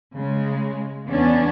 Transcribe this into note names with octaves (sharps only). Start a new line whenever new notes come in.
C#3 G#3
E2 B3 C#4 D4